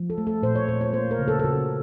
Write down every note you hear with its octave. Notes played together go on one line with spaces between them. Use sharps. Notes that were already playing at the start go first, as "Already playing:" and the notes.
Already playing: F3
A4
A3
A4
A#2 C5
C#5
A#2 C5
C#5
A#3 C5
A#4
C#3
A4
A4
C#3 F#4